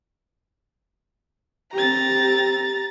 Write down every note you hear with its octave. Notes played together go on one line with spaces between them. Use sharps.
C4 G4 A#5 A6